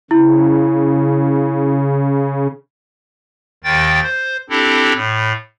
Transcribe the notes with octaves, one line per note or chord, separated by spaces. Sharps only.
C#3 E4
D#2 D#3 G5 A6
C5
C4 D4 E4 G4 A4
A2